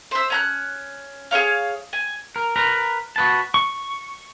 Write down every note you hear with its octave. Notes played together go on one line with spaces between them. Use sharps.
C5 E5
C#4 A#5 F#6
G#4 A#4 C#5 F5
G#5
A#4
A#4 B4 A#5
F#4 B4 A5
C#6